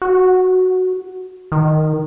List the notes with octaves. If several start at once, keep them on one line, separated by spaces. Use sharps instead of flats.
F#4
D#3